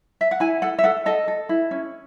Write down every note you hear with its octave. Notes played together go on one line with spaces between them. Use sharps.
E5
F#5
E4 G#5
A4 F#5
E5
A4 F#5
A4 D#5
A4
E4
C#4